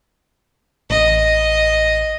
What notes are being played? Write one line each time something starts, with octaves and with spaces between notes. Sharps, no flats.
A1 D#5